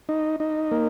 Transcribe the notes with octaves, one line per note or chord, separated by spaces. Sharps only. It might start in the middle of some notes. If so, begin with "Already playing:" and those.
D#4
D#4
A#3